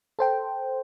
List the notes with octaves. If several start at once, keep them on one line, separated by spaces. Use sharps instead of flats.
A4 C5 G5